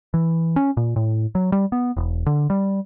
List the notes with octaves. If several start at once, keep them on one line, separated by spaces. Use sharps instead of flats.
E3
C#4
A#2
A2
F#3
G3
B3
E1
D3
G3